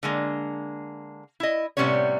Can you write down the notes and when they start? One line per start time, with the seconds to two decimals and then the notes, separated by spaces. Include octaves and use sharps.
0.03 D3 G#3 A#3
1.40 E4 D#5
1.77 A2 C3 G3 B3 C#4 C#5